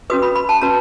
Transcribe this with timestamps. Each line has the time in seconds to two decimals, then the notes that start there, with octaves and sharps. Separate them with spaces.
0.10 C#4 F#4 B4 D#6
0.22 B5
0.35 B5
0.49 A5
0.61 C#4 F#4 B4 A#5